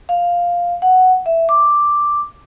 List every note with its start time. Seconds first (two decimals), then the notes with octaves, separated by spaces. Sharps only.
0.09 F5
0.82 F#5
1.26 E5
1.49 D6